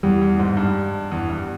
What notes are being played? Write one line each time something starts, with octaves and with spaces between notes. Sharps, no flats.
E2 G3
E2
G#2
G2
E2
G2